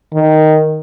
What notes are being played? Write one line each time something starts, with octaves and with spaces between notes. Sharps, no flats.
D#3